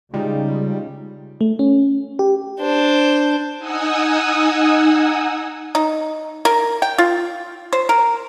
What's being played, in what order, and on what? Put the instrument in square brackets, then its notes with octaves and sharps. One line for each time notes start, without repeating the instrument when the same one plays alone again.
[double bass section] C#3 [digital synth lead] G3 [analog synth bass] G#3 [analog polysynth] D#4 F4
[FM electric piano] A3
C#4
G4
[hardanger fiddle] D4 C5
[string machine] D#4 F#5 G#5 D#6 E6
[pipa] D#4
A#4
G5
F4
C5
A#4